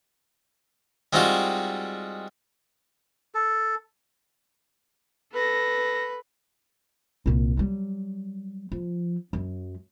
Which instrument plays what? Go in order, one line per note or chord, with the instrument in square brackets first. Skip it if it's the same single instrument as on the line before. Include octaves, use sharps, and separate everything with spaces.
[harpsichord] G3 G#3 C4 D#4 F4 F#4
[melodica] A4
[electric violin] A4 A#6 [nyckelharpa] B4
[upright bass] C2 A#2
F#3 G3
F3
F#2 F#3